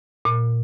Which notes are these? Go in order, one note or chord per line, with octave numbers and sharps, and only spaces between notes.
A#2